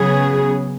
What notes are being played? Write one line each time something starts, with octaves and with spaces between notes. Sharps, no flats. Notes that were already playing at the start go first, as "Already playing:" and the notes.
Already playing: C#3 F#3 B3 G#4